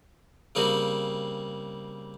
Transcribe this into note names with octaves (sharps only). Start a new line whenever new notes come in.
C#3 G3 A#3 C4 F#4 G#4